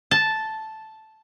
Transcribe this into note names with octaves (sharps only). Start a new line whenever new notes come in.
A5